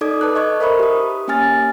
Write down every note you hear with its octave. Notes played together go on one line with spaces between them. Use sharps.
D#4 A4 D5 D6 D#6 G#6
B4 A5 D#6 F#6
D#5 C#6 G#6
A#4 C5 E5 B5 C#6
G4 D#6
A#3 C#4 G4 G#5 F6 A6